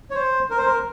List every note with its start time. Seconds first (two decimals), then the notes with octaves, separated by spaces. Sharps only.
0.11 C#5
0.15 C5
0.50 A#4
0.58 C5
0.66 A#4